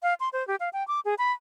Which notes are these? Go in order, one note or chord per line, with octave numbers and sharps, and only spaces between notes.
F5
C6
C5
G4
F5
G5
D6
G#4
B5